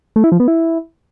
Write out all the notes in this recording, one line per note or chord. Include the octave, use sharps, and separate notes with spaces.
A3
E4
F3
B3
E4